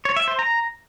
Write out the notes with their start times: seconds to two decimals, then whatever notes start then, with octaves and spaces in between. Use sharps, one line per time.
0.05 C#5
0.16 E5
0.28 C5
0.39 A#5